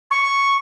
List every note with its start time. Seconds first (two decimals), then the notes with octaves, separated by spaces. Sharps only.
0.11 C#6